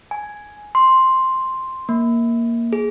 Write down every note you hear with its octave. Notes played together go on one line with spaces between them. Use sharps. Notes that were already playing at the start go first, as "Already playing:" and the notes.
G#5
C6
A#3
G#4